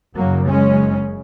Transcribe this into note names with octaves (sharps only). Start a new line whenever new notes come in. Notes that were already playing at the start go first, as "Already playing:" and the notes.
F#1 F#2 C#3 F#3 A#3
G#3 C#4